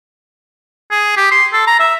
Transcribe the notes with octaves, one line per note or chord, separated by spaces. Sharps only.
G#4
G4
C6
A4
A#5
E5